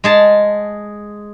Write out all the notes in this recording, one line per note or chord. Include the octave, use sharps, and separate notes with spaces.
G#3 G#4 A5